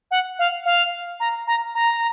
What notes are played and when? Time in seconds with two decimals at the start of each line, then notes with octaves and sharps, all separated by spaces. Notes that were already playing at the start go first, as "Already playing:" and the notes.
0.11 F#5
0.39 F5
0.65 F5
1.20 A#5
1.47 A#5
1.75 A#5